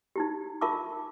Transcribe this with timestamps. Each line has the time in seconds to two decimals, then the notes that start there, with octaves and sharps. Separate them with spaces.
0.16 D#4 E4 G4
0.61 F4 A#4 E5 A5 C#6 D6